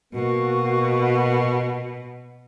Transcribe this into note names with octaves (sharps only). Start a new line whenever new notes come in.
B2 A#3 F#4